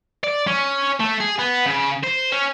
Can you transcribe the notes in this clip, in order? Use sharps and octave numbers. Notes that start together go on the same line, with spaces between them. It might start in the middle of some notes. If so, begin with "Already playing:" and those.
D5
C#4
A3
G#4
B3
C#3
C5
C#4